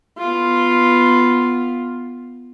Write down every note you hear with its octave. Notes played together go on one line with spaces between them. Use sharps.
B3 F4